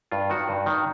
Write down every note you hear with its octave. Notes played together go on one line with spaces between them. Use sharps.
G2 F4
D#3 F#4
G2
D#3